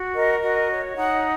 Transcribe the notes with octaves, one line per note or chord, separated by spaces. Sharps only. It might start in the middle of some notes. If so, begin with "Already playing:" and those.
Already playing: F#4
A#4 D#5
F#4 D#5
C#5
D#4 F#5